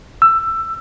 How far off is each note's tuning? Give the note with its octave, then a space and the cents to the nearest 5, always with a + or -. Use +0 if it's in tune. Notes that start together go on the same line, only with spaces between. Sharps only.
E6 +15